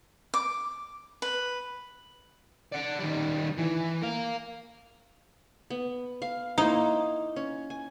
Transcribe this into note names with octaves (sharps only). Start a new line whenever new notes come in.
D6
B4
D5 F#5
D#3 G3
E3
A#4 F5
B3
F5
A#3 D#4 E4 C5
C#4
G#5